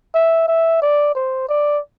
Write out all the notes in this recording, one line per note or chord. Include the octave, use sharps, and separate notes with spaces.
E5
E5
D5
C5
D5